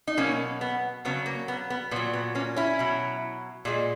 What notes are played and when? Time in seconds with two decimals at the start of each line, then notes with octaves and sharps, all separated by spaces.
0.07 D#4
0.17 B2 F#3 A#3 C#4
0.61 B3
1.05 C#3 F#3 B3
1.26 A#3
1.48 B3
1.70 B3
1.91 A#2 B3
1.96 F#3
2.13 B3
2.35 A#3 C#4
2.56 C#4 E4
2.79 B2 F#3
3.65 A#2 G#3